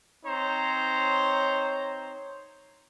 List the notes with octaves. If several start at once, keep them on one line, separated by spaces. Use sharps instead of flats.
C4 D#4 C5 C#5 A#5